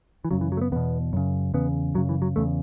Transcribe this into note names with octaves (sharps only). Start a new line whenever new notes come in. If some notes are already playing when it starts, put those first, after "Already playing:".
E3
F#2 C#3 F#3
E3
F#3
A3
B3
E2 B2 B3
F#2 C#3
E2 C#3 B3
F#2 C#3 F#3
E3
F#3
E2 C#3 A3